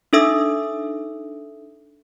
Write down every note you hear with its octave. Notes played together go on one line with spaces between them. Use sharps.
D4 D#4 A4 E5 D#6 E6